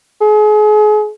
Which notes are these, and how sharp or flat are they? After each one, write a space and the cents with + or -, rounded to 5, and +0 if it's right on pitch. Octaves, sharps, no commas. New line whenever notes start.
G#4 +35